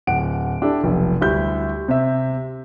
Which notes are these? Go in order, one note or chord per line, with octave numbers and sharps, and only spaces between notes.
D1 F#5 D7
D4 E4 G4 A4
F1 B1
D2 G3 E4 E5 G6
C3 E5